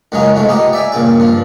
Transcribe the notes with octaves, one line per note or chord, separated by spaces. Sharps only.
C#2 F#2 F#3 C#4 D#4 F4
C2 G#2 G#3 A3
B3 D#4 F4 G4
D5 E5 G5 G#5
G2 A#2 C#3 G5
G2 F3